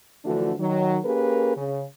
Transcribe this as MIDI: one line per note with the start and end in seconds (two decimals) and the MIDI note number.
0.25 0.52 50
0.25 0.52 52
0.25 0.52 53
0.25 0.52 57
0.25 0.52 62
0.25 0.52 66
0.59 0.98 51
0.59 0.98 54
1.04 1.56 58
1.04 1.56 61
1.04 1.56 67
1.04 1.56 68
1.04 1.56 70
1.04 1.56 71
1.57 1.83 49